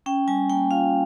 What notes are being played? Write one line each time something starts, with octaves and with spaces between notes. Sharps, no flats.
C#4 G5
G3 G#5
A#3 G5
F4 F5